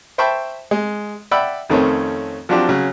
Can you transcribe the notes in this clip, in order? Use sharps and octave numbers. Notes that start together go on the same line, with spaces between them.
C5 E5 G5 A5 B5 C#6
G#3
D5 E5 F#5 G5 B5 E6
F2 D#3 A3 C4 C#4 C#5
F3 F#3 C4 D4 F4 G4
C#3 F#3 C#4